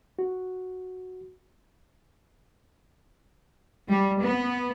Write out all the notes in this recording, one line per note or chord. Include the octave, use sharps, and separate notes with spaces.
F#4
G3
B3